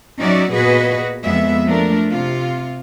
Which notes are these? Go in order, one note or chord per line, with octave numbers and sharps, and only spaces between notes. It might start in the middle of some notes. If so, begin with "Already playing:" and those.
F#3 C#4 D#4 F#4 D5 E5
A#2 B3 F#4 G#4 B4 D#5
F2 G#3 B3 E5
F3 A3 D4 A#4
C3 F4